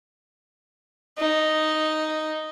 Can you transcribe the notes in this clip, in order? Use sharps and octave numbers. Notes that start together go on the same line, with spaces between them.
D#4